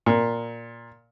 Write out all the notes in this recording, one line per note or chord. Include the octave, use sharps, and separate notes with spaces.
A#2